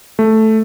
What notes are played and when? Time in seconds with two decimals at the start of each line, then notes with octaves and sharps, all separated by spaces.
0.19 A3